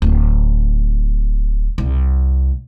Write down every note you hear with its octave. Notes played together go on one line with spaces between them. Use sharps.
D1
C2